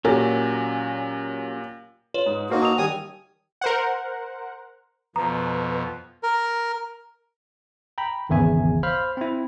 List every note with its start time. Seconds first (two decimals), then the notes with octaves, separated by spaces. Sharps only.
0.05 A#2 F#3 C#4 G4 A#4
2.14 F4 B4 C#5
2.26 G#2
2.50 A#3 D#4 F#4 A#4 C5
2.62 A5 D#6 E6 F7
2.78 D#3 G3 G5 G#5 D#6
3.61 A#4 C5 F#5
5.16 F2 B2 F3 B4 A#5
6.23 A#4
7.98 G5 A#5 B5
8.29 G#1 E2 C#3 E5 G#5
8.83 C5 F5 B5 F6
9.17 C4 E4